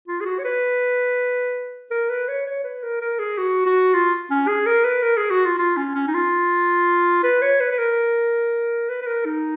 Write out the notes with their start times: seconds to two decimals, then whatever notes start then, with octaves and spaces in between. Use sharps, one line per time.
0.08 F4
0.20 G#4
0.25 F#4
0.39 C#5
0.44 B4
1.91 A#4
2.10 B4
2.28 C#5
2.46 C#5
2.64 B4
2.83 A#4
3.01 A#4
3.19 G#4
3.38 F#4
3.66 F#4
3.94 F4
4.30 C#4
4.48 G#4
4.66 A#4
4.84 B4
5.03 A#4
5.17 G#4
5.30 F#4
5.45 F4
5.58 F4
5.77 C#4
5.95 C#4
6.07 D#4
6.14 F4
7.23 B4
7.42 C#5
7.60 B4
7.71 B4
7.78 A#4
8.89 B4
9.02 B4
9.07 A#4
9.25 D#4